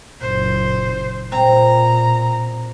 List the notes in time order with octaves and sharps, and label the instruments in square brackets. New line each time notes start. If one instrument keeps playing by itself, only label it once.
[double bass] F#1 A#2 [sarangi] C5
[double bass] A#2 [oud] C4 [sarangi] A#5